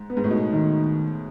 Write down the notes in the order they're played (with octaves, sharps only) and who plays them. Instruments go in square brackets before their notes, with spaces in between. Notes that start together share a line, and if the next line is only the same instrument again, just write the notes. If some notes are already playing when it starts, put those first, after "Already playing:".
Already playing: [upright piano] G#2
[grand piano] B3
[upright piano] G#2
A2
[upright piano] B2 [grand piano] D#4
[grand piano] D#3